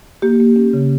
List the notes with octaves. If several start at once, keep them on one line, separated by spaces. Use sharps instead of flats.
A#3 G4
A#3
C#4
C#3